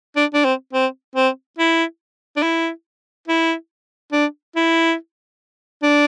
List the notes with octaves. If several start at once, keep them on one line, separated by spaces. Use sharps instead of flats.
D4
D4
C4
C4
C4
E4
D4
E4
E4
D4
E4
D4